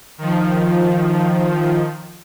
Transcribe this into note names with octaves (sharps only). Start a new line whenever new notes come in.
D#3 F3